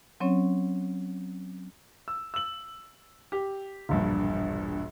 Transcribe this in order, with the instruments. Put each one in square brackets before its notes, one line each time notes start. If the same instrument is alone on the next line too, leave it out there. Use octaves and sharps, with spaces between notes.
[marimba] F#3 C4 C#4 C#5
[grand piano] E6
E6 F#7
G4
E1 A#1 G2